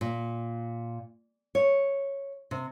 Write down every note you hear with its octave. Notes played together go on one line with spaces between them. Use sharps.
A#2
C#5
C3